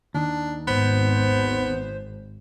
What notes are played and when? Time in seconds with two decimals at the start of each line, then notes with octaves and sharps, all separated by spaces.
0.15 D#2 D#3 D4
0.68 G#1 B3 C5